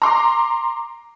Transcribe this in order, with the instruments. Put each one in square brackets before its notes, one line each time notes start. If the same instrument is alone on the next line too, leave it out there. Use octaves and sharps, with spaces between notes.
[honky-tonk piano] A#5 C6 D6